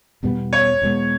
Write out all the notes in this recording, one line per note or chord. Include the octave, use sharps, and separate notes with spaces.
E2 B2 G3 B3
C#5
E2 B2 G#3 B3